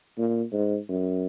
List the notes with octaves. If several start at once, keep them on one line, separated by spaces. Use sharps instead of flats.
A#2
G#2
F#2